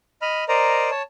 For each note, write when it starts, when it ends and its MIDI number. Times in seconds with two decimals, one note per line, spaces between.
0.22 0.44 75
0.22 0.44 83
0.22 0.44 89
0.48 0.90 70
0.48 0.90 72
0.48 0.90 74
0.48 0.90 75
0.48 0.90 82
0.91 1.02 73
0.91 1.02 81